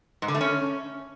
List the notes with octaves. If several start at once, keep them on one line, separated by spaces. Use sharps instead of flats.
G#2
D3
A3
C#4